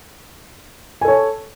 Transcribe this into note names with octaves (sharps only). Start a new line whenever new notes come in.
A4 C#5 G#5